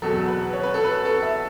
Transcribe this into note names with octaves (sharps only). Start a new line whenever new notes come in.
E2 B2 F#3 A4
B4
C#5
B4
A4
B4
A4
E5